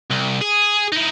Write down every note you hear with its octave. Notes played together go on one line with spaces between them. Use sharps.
C2
G#4
D#4 E4